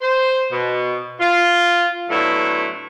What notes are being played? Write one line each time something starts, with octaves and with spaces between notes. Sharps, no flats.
C5
B2
F4
A2 D3 F#3 A3 B3 E4